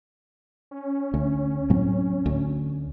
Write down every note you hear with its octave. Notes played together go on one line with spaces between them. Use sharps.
C#4
D2
A2 F#3 C4
D2